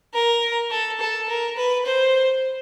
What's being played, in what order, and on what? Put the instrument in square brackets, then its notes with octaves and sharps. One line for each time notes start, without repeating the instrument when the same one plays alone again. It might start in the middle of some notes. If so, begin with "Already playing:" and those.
[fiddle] A#4
A4
A4
A#4
B4
C5